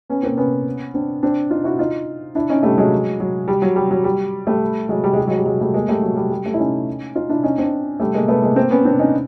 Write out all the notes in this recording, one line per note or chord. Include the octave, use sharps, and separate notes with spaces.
B3 C#4
A#3 C4
B3 C#4
C4 D4
C4 D4
D#4 F4
E4 F#4
D#4 F4
D4 E4
C#4 D#4
G3 A3
F#3 G#3
F#3
G3
F#3
G3
F#3
G3
G3 A3
F#3 G#3
G3
G#3
G3
F#3 G#3
G3
F#3 G#3
G3 A3
G#3 A#3
G3 A3
F#3
G3
G3
G3 A3
E4
C#4 D#4
D#4 F4
D4 E4
C#4 D#4
C4 D4
G3 A3
G#3 A#3
A3 B3
G#3 A#3
A#3 C4
B3 C#4
C4 D4
C#4 D#4